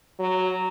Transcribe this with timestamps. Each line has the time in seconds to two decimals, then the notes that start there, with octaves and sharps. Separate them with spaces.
0.19 F#3